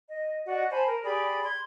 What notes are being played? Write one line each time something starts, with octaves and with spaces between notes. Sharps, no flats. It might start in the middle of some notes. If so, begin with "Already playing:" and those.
D#5
F#4 D5 D#5 F#5
C5 G#5 A5 B5
A#4
G4 G#4 D5 B5
C6 G#6